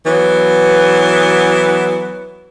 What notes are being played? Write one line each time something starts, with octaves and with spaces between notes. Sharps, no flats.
E3 F#3 B3